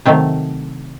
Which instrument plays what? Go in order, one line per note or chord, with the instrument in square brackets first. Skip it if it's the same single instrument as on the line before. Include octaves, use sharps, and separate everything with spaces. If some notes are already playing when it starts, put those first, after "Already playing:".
[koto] C3 D#3 F#3 A3 C4